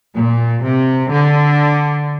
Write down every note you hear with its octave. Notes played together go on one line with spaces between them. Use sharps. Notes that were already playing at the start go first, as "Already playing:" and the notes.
A#2
C3
D3